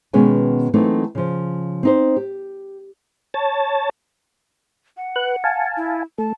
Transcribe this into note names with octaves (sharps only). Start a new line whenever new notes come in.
B2 D#3 G#3 B3 C#4 G#5
E3 F#3 A3 A#3 C4 D#4
C#3 F3
C4 D#4 C5
G4
C#5 A5
F#5
B4 F#6
F5 G#5 A5
E4
A3 A5